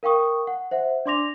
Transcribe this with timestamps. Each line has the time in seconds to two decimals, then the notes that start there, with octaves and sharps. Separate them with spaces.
0.03 A#4 F5 G5 C#6 D#6
0.47 F#5
0.71 C5 E5 F#5
1.06 D4 D5 C6 D6 A#6 F7